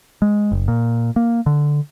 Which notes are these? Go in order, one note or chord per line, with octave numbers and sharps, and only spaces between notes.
G#3
F#1
A#2
A#3
D3